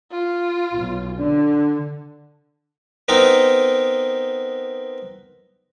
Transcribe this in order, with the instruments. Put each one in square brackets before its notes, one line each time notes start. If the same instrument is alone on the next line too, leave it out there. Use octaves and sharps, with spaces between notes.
[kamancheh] F4
[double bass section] B1
[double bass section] D3 [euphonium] D4
[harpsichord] B3 C4 D#4 A#4